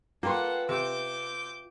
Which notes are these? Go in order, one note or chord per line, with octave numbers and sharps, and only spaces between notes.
A#3 F4 A4 B4 F#5 G5 C6
C3 D6 G6